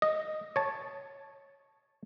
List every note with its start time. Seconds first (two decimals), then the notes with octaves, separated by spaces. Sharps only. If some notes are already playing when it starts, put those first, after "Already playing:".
0.02 D#5
0.56 C#5 A5